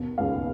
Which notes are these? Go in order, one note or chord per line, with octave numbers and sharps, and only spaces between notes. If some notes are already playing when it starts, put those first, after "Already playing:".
Already playing: D#2 B2
C#2 F5